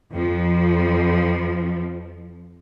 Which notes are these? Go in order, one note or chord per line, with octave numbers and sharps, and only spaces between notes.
F2 F3